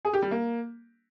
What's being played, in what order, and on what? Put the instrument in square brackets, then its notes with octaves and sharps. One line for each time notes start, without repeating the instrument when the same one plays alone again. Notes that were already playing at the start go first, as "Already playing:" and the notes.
[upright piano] G#4
G4
G3
A#3